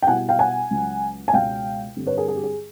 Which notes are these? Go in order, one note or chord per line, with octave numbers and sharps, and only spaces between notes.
G5
B2 G3 B3 E4 F#5 G#5
F5 G5
F#5 G#5
C#2 C#3 F#3
G#5
C#2 B2 G#3 C#4 F5 G5
G2 D3 G3 C4
B4 C#5
G#4 A#4
G#4
G4
G#4